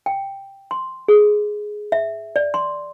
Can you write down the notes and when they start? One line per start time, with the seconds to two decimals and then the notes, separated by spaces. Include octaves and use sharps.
0.06 G5
0.71 C6
1.08 G#4
1.92 E5
2.36 D5
2.54 C6